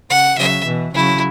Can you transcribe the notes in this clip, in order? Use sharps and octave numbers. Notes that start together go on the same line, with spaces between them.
C#3 F#5
C#3 F#3 E5
B2 E3
C#3 F#3 E4